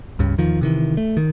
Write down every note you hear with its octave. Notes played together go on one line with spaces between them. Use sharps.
C#2 G2 C#3
E2 D#3 F3
C3 D#3 E3
A3
D#3